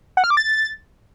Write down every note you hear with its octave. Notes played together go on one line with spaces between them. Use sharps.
F#5
F6
D6
A6